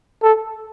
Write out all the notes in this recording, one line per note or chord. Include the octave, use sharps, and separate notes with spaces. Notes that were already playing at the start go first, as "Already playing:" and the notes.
A4